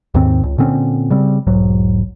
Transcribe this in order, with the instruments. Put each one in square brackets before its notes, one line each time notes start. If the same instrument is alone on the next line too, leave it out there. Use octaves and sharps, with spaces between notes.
[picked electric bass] D#2 G#2 D#3 C4
C#2
A#2 D3 C4 C#4
C#3 G3 C4
E1 B1 G#2 F#3